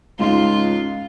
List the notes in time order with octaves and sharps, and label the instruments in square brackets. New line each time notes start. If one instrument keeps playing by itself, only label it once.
[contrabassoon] C#2 [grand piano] G#2 D#4 C6 [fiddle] F4